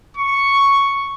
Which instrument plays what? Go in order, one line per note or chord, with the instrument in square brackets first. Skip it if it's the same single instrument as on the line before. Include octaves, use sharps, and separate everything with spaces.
[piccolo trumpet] C#6